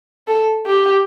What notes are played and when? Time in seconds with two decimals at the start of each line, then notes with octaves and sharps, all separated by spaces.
0.27 A4
0.66 G4